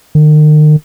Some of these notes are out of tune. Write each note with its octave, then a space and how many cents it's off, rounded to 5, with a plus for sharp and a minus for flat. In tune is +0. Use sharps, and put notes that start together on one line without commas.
D#3 -40